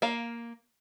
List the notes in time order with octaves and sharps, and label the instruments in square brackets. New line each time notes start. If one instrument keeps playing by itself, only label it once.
[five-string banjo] A#3 F5